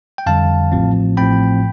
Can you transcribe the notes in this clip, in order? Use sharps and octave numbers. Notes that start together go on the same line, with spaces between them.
G5
F2 D3 G3 F5 A5
A1 A2 F3 C4
A1 A2 F3 C4 G5 B5